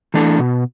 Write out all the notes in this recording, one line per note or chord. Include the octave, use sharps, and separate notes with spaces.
E3 A3 D4 A4
B2